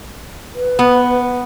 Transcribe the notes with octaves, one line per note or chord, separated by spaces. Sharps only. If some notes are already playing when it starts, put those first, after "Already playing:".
B4
B3